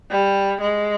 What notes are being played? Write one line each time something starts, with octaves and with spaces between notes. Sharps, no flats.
G3
G#3